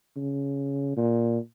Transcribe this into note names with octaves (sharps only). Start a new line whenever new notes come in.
C#3
A#2